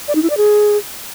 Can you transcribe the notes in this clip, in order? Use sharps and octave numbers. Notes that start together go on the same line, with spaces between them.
D5
D#4
E4
D5
G#4